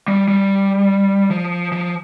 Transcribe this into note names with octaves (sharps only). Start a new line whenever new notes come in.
G3
G3
F3
F3